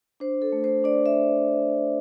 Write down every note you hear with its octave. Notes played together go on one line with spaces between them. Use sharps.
D4 C5
A4
A3
C5
D4 D5
E5